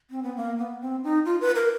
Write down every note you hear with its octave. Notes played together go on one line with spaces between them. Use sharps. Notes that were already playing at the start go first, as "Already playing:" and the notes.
C4
B3
A#3
B3
C4
D#4
F4
B4
A#4